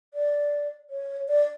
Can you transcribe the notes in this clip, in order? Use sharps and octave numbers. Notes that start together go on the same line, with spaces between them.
D5
C#5
D5